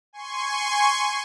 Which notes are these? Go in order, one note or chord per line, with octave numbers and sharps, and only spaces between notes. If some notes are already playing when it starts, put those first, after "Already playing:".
G#5 C6 C#6